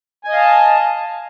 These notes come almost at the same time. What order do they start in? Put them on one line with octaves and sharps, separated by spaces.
G#5 D#5 F5 A5